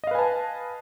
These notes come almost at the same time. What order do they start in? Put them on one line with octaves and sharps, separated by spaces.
D#5 F5 B4 G#5 A5